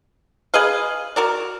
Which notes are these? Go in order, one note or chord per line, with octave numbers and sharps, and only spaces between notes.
G#4 B4 D#5 F5
F#4 A#4 D5